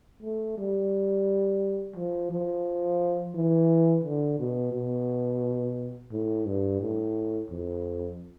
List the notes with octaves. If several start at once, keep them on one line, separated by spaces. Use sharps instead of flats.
A3
G3
F3
F3
E3
D3
B2
B2
A2
G2
A2
F2